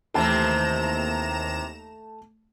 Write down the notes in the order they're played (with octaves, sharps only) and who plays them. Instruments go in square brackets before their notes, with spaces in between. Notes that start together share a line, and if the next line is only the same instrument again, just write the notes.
[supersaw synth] D#2 A#5 E7 [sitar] C3 E3 C4 [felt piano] A3 A5